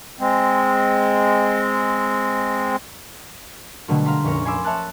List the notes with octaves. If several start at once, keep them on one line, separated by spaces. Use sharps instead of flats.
G#3 C4
B2 D3 F#3 G3 A3
F5 A#5 C6 B6
F1 A#1 C#4 C#5 A#6
G#5 B5 C6 D6 E6
C#5 E5 A5 F#6 A6